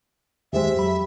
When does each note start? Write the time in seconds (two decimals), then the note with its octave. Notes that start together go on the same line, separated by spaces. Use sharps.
0.53 D#2 G#3 G4 C5 E5
0.76 F2 F#3 B5